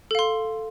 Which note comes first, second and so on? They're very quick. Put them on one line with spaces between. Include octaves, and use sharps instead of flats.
A4 F5 C6